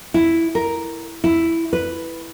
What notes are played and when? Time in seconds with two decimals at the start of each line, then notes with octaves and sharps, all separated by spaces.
0.14 E4
0.55 A#4
1.24 E4
1.73 B4